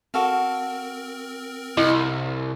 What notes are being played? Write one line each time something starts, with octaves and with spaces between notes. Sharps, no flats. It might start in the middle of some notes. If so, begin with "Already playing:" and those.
C4 F#4 A4 A#4 F5
C2 E4 D#5